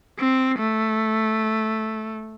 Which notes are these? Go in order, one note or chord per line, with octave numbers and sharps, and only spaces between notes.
C4
A3